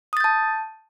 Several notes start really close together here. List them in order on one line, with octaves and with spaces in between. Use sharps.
D#6 A6 G6 A5